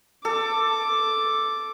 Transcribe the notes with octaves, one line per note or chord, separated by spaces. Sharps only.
A4 D6